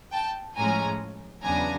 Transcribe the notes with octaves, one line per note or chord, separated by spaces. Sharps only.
G5 A5
A2 F3 G#3 C#4 G#5 A#5
E2 C#3 F#3 B3 D4 G#5 A#5